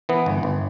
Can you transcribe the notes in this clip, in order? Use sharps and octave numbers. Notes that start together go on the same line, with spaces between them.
E3 B3
G1
G1